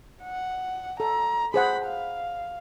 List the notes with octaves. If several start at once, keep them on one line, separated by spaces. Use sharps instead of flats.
F#5
A4 A#5
G#4 C5 F#5 B5
F5